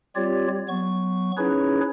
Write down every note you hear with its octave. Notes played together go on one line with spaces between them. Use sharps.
G3 C4 F4 G4 C#5 D5
F#3 B3 C#6
C#4 D#4 E4 G#4 B4 C#5